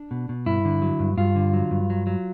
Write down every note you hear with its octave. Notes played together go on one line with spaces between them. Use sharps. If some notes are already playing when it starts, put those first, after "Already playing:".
Already playing: D4
B2
B2
G2 E4
D3
F#3
G2
G2 F4
D3
F#3
G2
F#3
F#3